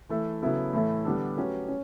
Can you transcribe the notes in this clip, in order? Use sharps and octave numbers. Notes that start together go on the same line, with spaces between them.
E3 A3 E4 A4
C#3 F#3 B3 E4 A4
A2 E3 A3 E4 A4
D3 G3 B3 D4 A4
F#3 A3 C#4 G4 B4
C#4